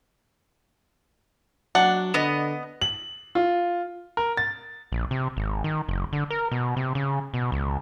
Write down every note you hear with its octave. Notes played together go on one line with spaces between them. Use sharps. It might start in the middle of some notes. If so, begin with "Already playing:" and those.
F#3 D4 F#5
D3 B3 D#5
F#7
F4
A#4
A6
A#1
C3
G#1
D#3
F#1
D3
A#4
B2
C3
C#3
B2
C#2